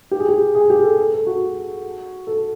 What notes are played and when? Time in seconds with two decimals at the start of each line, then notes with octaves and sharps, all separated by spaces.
0.11 G4
0.20 G#4
0.29 G4
0.55 G#4
0.70 G4
0.83 A4
0.98 A4
1.13 A4
1.27 F#4
2.27 A4